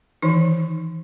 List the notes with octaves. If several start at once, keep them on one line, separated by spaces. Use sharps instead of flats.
D#3 E3 D#4